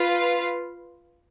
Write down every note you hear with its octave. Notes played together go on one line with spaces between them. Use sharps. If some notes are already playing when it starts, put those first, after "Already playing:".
Already playing: F4 B4 F5